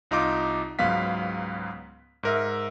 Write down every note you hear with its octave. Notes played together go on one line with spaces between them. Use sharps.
C2 D#4 F4 D6
C#2 G#2 F#3 B3 F5 B6
G#2 A#4 E5